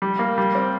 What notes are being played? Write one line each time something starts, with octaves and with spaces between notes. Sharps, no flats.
G3
A#3
G3
C4